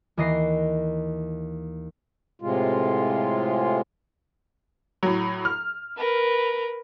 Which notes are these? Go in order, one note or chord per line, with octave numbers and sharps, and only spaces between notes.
D#2 E3 D#5 A#6 C7
A2 C3 G#3 F4
A2 F#3
F6
A#4 B4